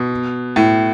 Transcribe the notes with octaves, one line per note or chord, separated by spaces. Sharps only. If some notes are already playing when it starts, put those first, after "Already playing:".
Already playing: B2
A2